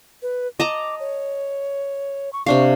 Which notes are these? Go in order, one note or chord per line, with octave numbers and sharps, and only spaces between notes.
B4
D#5 A5 A#5 D6
C#5
C#6
C3 D4 F5 C#6